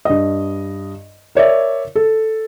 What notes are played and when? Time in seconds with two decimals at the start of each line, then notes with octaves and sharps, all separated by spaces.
0.05 G2 D#5
1.35 A#4 C#5 D5 E5
1.95 A4